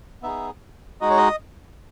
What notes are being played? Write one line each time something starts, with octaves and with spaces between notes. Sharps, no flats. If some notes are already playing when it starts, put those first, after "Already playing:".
B3 D#4 G#4 E5
G#3 D#4 F#4 D#5
C#5
D#5